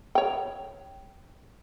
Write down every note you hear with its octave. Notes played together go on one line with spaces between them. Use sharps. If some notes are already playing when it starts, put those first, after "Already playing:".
C#5 G5